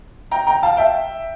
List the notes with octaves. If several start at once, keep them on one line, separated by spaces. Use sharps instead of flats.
G5 A#5
G5 A#5
F5 A5
E5 G5